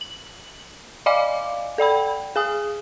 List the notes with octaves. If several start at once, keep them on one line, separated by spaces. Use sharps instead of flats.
F#7
D5 D#5 F5 G#5 D6
A4 D5 G5 B5
G#4 G#5 D#6